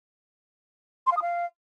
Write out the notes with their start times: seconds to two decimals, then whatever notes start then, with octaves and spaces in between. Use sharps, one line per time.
1.07 C6
1.12 F5
1.17 D#6
1.22 F5